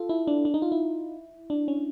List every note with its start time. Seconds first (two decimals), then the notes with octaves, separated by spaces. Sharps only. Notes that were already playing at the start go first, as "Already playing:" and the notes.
Already playing: F4 A4
0.09 E4
0.27 D4
0.45 D4
0.54 D#4
0.62 F4
0.72 E4
1.50 D4
1.68 C#4